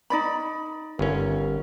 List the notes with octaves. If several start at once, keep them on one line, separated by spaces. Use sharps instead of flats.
D#4 D5 B5
G1 C#4 A#4